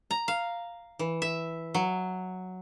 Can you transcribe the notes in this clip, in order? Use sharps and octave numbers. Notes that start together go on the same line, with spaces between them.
A#5
F5
E3
E5
F#3